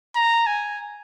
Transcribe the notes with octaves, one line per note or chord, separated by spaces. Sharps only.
A#5
G#5